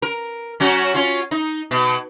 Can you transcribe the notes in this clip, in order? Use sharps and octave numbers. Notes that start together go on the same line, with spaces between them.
A#4
F#3 C#4 F#4
C#4 F4
D#4
B2